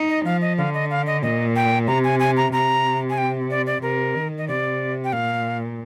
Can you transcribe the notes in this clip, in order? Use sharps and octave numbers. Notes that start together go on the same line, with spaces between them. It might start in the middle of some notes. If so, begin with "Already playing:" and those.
Already playing: D#4
D#5
F3 F5
D#5
D3 F5
D#5
F5
D#5
A#2 D#5
G5
C3 A#5
G#5
G#5
A#5
C3 A#5
G#5
G5
D5
D5
C3 A#4
D#3
D#5
C3 D5
G5
A#2 F5